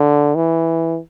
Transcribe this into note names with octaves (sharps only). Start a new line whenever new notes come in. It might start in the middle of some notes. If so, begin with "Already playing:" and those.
Already playing: D3
E3